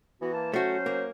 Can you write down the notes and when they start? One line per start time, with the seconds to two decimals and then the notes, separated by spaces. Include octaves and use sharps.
0.21 E3 B3 F#4
0.34 A#3 A5
0.54 F#3 A3 C#4 F#4 C5
0.86 A#3